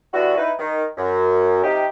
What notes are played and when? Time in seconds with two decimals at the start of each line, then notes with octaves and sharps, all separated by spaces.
0.14 D3 G3 B3 D4 E4 F#4
0.37 D#4 E4 B4
0.59 D#3
0.98 F#2
1.64 C3 F3 D#4 G4